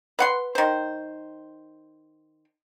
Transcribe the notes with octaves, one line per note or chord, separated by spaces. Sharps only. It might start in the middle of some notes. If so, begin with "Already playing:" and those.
B4 F#5 C6
D#3 C5